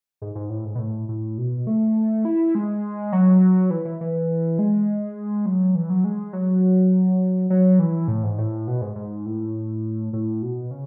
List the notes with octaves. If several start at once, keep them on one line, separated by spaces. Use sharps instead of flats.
G#2
G#2
A2
G#2
B2
A2
A2
B2
A3
E4
G#3
F#3
E3
E3
E3
G#3
F#3
E3
F#3
G#3
F#3
F#3
E3
A2
G#2
A2
B2
G#2
G#2
A2
A2
B2
C#3